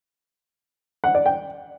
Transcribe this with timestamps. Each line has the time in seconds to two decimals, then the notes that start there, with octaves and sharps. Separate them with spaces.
1.04 F#5
1.15 D5
1.26 G5